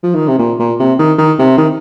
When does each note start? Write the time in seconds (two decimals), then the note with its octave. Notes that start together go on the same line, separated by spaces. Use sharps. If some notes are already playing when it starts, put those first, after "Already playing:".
0.04 F3
0.15 D#3
0.28 C3
0.39 A#2
0.60 A#2
0.80 C3
0.99 D#3
1.18 D#3
1.39 C3
1.58 D#3